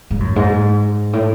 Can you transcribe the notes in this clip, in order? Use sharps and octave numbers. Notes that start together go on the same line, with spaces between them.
G#2
F#2
G#2
A2